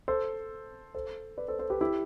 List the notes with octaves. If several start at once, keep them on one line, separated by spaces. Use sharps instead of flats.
A4 C5
A4 C5
B4 D5
A4 C5
A4 C5
G4 B4
E4 G4